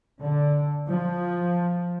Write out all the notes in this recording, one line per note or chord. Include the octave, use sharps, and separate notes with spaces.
D3
F3